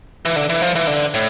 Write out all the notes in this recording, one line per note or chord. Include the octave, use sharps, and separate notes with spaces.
E3
D3
E3
F3
E3
D3
A2